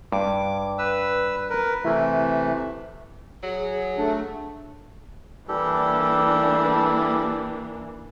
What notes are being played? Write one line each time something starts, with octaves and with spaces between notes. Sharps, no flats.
G2 D6
B4 E6
A#4 B4
C3 E3 A3 E4
F#3 G#4
A3 D4
E3 G3 A#3 D4 G4 A4